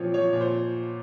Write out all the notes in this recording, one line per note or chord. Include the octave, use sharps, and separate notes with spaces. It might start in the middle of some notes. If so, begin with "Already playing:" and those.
Already playing: A#2 F3 C4 C#5
F3 C#5
A#2
C5